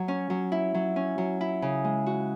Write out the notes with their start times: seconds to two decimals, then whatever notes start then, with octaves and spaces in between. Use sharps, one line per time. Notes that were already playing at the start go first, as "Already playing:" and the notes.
Already playing: F#3
0.08 C#4
0.30 F#3
0.52 E4
0.74 F#3
0.96 C#4
1.18 F#3
1.41 E4
1.62 C#3
1.84 G#3
2.06 F#4